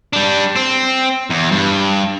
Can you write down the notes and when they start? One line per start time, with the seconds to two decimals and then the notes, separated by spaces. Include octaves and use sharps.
0.13 G3 D4
0.56 C4
1.30 E2
1.51 G2